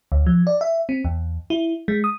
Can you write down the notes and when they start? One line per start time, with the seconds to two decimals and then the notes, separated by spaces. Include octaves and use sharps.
0.12 D2
0.26 F3
0.47 D5
0.61 E5
0.89 C4
1.05 E2
1.50 E4
1.88 G#3
2.04 D#6